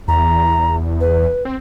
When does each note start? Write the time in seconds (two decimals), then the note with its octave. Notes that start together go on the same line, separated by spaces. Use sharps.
0.08 E2 A#5
1.00 B4
1.45 C4